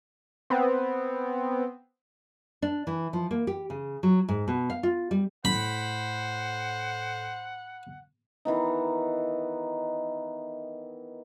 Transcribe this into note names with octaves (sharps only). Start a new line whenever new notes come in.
B3 C4
D4
E3
F3
A#3
G4
C#3
F#3
G#2
B2
F5
F4
G3
A2 C5 F#5 B5
D#3 E3 B3 D#4